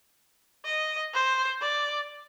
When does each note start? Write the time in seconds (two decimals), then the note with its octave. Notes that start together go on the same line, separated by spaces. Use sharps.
0.65 D#5
1.14 C5
1.62 D5